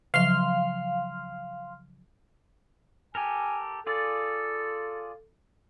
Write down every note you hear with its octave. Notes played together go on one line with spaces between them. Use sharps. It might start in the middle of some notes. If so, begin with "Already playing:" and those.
C#3 F3 F#3 F5 C6 F6
G4 A4 A#4 G#5
F4 G#4 A4 D5